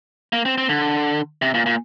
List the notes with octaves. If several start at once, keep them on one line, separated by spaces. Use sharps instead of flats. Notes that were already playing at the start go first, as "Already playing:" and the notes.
A#3
C4
C4
D3
C3
A#2
A#2